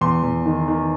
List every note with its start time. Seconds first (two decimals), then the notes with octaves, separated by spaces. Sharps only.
0.01 E2 C6
0.23 E2
0.46 D#3
0.68 D#3